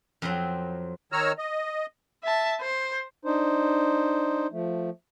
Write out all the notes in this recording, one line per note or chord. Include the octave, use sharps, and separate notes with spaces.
F2 F#3 C4
D#3 C#5 A#5 E6 F6
D#5
E5 A5
C5
D4 D#4 C5
F3 A3